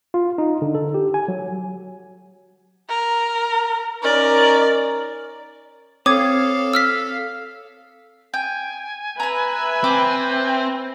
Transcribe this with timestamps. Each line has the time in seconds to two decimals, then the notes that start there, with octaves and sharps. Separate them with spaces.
0.14 F4
0.38 D#4
0.62 D3
0.75 A4
0.94 G4
1.14 G#5
1.28 F#3
2.89 A#4
4.03 C#4 D#4 A#4 D5
6.06 C4 A4 C#5 F5 D6 D#6 G#6
6.74 E6 F6 B6
8.34 G5 G#5
9.20 B4 E5 A#5 E6
9.84 C4 D6